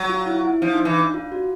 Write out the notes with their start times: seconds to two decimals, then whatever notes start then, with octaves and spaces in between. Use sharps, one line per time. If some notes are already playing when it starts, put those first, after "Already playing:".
Already playing: F#3
0.09 F4
0.26 E4
0.45 E4
0.62 F3 D4
0.72 D#4
0.79 D4
0.85 E3
0.97 D4
1.14 F4
1.32 F#4